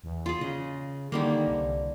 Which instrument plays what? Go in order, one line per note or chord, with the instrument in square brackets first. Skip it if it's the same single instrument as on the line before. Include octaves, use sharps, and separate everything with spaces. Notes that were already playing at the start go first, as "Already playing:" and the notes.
[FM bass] E2
[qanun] F4 G#4
[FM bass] C#3 [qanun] D#5
[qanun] D3 G3 A#3 [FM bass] D#3
[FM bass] C2